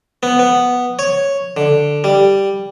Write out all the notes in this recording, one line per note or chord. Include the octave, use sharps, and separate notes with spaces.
B3
B3
C#5
D3
G3